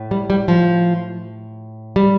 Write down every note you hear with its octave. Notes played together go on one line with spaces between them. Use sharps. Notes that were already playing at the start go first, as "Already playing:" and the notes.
Already playing: A2
G3
G3
F3
G3